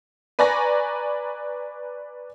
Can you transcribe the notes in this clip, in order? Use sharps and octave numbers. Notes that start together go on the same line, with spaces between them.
B4 D5 G#5 A#5 C#6 A#6